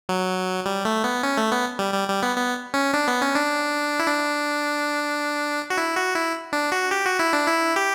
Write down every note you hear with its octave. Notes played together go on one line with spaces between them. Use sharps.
F#3
G3
A3
B3
C#4
A3
B3
G3
G3
G3
B3
B3
C#4
D4
B3
C#4
D4
E4
D4
F#4
E4
F#4
E4
D4
F#4
G4
F#4
E4
D4
E4
G4